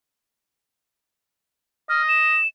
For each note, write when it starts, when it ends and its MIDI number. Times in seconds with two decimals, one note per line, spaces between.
1.89 2.37 75
1.89 2.02 89
2.08 2.47 100